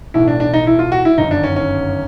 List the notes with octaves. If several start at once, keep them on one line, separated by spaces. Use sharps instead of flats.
B1 A2 E3 E4
D4
D4
D#4
E4
F4
F#4
E4
G1 F#2 D#3 D#4
D4
C#4
C#4